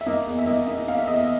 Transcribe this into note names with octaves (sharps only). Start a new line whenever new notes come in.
E5
A#3 D#5
E2
E5
A#3 D#5
A#3 E5
A#3 F5
E5
E2 D#5
E5